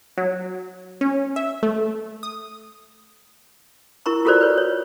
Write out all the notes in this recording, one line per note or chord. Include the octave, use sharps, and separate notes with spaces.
F#3
C#4
E5
A3
D#6
E4 A#4 A#5 C#6
F4 F#4 A4 A#4 C5 D5
B4 C#5
C#5